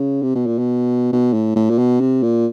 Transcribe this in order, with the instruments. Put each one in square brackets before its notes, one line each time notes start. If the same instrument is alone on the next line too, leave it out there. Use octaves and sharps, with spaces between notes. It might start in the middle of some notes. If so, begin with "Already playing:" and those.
Already playing: [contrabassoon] C#3
C3
B2
A#2
B2
B2
A2
A2
A#2
B2
C3
A#2